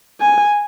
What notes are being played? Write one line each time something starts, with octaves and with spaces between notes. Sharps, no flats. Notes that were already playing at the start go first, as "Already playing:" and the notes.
G#5